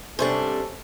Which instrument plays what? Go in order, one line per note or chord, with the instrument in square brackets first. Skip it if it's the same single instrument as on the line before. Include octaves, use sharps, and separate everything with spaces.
[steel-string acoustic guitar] C3 G3 D4 [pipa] C#4 C5 [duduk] A4